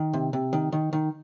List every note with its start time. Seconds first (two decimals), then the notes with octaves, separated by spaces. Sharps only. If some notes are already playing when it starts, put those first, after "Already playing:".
Already playing: D#3
0.13 C3
0.33 C3
0.53 D#3
0.72 D#3
0.93 D#3